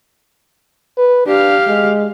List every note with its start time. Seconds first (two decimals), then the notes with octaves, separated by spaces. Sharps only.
0.98 B4
1.27 D4 G4 F5
1.68 G#3